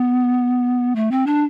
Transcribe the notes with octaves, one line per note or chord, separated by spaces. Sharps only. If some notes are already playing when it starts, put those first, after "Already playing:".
Already playing: B3
A3
C4
D4